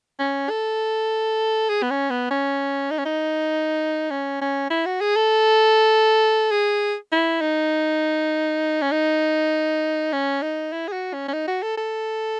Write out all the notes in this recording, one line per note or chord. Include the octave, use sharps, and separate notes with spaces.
C#4
A4
G#4
B3
C#4
B3
C#4
D#4
C#4
D#4
C#4
C#4
E4
F#4
G#4
A4
G#4
E4
D#4
C#4
D#4
C#4
D#4
E4
G#4
F#4
C#4
C#4
D#4
F#4
A4
A4